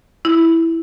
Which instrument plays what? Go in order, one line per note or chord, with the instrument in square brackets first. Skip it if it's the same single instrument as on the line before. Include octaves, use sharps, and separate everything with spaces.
[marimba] E4